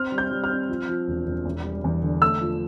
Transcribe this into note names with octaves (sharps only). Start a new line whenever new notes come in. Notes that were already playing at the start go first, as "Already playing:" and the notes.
Already playing: C4 F6
G3
G6
G3
F6
C4
F3
F3
E1
E1
E2
G3
E2
D3
A3 E6
F3